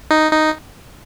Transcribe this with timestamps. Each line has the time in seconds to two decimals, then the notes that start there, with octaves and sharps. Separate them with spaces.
0.11 D#4
0.31 D#4